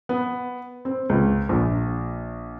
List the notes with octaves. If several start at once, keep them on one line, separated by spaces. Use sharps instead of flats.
B3
C4
C#2
A#1